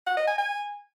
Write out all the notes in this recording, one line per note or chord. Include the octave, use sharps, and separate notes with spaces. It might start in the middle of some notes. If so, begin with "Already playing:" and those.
F#5
D#5
G#5
G#5